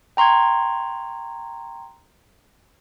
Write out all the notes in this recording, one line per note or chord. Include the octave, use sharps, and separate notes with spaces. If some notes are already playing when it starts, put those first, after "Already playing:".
G5 A#5 C6 C#6 G#6